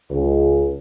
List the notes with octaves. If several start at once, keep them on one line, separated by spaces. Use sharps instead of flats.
C#2